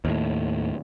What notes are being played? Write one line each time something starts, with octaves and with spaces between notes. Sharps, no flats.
D#2 A2